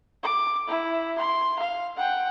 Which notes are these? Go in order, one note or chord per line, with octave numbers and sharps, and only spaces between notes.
D6
E4
C6
F5
F#5 G5